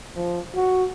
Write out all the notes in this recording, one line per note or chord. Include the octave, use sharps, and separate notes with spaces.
F3
F#4